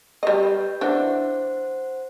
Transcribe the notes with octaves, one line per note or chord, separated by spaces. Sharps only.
G3 G4 B4 D#5 G6
E3 D4 C5 F#5